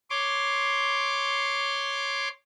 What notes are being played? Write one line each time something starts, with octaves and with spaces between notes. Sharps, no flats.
C#5 C6 D6